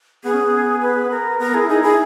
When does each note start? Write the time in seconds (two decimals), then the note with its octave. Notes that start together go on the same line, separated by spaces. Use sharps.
0.24 B3 G#4
0.33 C#4
0.41 B3
0.82 B4
1.11 A#4
1.39 B3 A#4
1.54 E4 G#4
1.69 D#4 G#4
1.82 E4 G#4